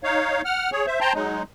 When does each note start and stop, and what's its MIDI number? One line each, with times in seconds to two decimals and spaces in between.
0.03 0.42 63
0.03 0.42 73
0.03 0.42 77
0.45 0.70 78
0.45 0.70 89
0.72 0.86 68
0.72 0.86 73
0.87 1.00 72
0.87 1.00 76
1.00 1.13 72
1.00 1.13 79
1.00 1.13 81
1.00 1.13 82
1.00 1.13 84
1.15 1.43 54
1.15 1.43 56
1.15 1.43 63